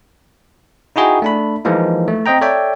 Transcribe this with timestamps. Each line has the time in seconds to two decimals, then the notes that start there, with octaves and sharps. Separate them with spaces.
0.96 D#4 E4 F#4 G#4 G5
1.22 A3 D4 B5
1.65 E3 F3 G#3 A#3 D#4
2.08 A3
2.26 C4 C5 D#5 G5 A#5
2.41 A4 C#5 D5 E5 G5